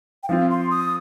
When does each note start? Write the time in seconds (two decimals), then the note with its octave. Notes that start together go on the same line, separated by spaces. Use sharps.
0.23 G5
0.29 F3 C4 F4 F5
0.50 C6
0.71 D#6